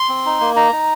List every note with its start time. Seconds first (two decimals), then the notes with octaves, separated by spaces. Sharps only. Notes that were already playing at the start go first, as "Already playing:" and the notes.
Already playing: C6
0.09 C4
0.26 D#4
0.40 A#3
0.56 D#4 A#5
0.72 D#4